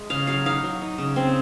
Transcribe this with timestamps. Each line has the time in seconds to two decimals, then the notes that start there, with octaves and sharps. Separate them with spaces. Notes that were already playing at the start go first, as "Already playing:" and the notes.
Already playing: G#3
0.10 C#3 F5
0.27 F#3 F5
0.46 D#4 F5
0.63 F#3
0.82 D#4
0.98 C#3
1.16 C4